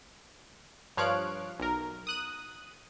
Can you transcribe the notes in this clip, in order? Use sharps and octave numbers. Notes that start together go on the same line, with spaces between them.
G2 F3 C#5 F5 F#6 D7
B1 A#4
D#6 F#6 D#7